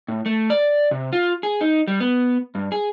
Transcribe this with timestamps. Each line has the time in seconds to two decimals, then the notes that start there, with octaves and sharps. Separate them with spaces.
0.08 A2
0.26 A3
0.50 D5
0.91 C3
1.13 F4
1.43 G#4
1.61 D#4
1.88 G3
2.00 B3
2.55 G2
2.72 G#4